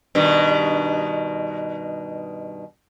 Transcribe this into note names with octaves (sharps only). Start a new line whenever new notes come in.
G2 B2 D#3